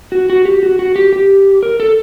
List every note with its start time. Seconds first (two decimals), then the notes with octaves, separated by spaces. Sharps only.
0.12 F#4
0.30 F#4
0.45 G4
0.63 F#4
0.79 F#4
0.96 G4
1.13 G4
1.63 A#4
1.80 A4